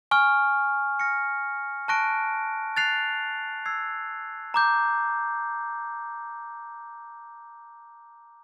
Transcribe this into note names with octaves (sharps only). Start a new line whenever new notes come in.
G#5 C#6 F6
F6 A#6 C#7
A5 C#6 F#6 A#6 D7
F#6 A6 C7 F7
E6 G#6 C7
A#5 D6 G6